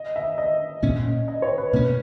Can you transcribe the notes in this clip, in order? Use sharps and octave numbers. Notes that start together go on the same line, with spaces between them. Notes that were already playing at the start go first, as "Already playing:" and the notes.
Already playing: D#5
E5
D#5
A#2 A#3 C#4
D#5
C#5
B4
B2 A#3 C#4 B4